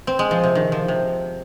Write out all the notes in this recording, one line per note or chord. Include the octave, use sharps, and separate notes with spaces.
C4
G#3
F3
C3
D#3
F3
C3